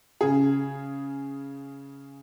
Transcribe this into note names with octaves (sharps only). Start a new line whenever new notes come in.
C#3 G#4